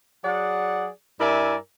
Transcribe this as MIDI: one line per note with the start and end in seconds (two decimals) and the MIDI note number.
0.24 0.88 54
0.24 0.88 68
0.24 0.88 74
0.24 0.88 78
1.20 1.55 43
1.20 1.55 64
1.20 1.55 70
1.20 1.55 74
1.20 1.55 76
1.20 1.55 80